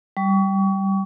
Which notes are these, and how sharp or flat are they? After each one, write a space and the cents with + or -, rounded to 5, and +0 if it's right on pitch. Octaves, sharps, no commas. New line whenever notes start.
G3 -10 C#6 +35